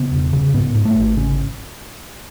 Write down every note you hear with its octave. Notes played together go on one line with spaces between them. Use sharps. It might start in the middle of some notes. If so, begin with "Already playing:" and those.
Already playing: C#3 B3
E1
C#3
G#2 B3
G#2
A3
G#1
C#3